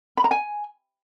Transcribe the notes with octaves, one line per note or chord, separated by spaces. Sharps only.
B5
A#5
G#5